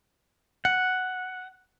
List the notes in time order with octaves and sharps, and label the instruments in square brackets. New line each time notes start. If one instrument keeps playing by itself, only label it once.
[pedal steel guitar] F#5